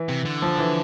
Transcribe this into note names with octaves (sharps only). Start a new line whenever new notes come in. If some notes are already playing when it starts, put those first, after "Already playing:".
Already playing: E3
C3
D3
F3
E3